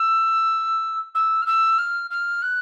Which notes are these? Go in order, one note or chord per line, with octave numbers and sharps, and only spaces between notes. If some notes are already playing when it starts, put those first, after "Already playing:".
Already playing: E6
E6
F6
E6
F6
F6
F#6